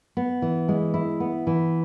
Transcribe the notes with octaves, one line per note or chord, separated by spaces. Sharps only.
B3
E3
G#3
E4
B3
E3